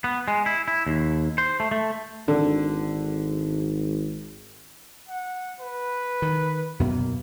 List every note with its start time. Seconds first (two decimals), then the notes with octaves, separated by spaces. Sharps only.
0.04 B3
0.28 G#3
0.46 E4
0.68 E4
0.87 D#2
1.38 C5
1.60 A3
1.71 A3
2.28 G#1 D3
5.09 F#5
5.60 B4
6.22 D#3
6.80 F#2 B2 A#3 B3